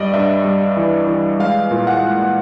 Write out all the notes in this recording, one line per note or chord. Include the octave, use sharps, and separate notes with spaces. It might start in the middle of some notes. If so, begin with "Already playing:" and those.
Already playing: G2 G3 D5 D#5
G2 E5
G3
E3
E3
G#3 F5
A#2
F#5
G#3